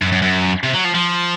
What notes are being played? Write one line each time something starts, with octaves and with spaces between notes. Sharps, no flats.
F#2
F#2
F#2
C3
F#3
F3
F3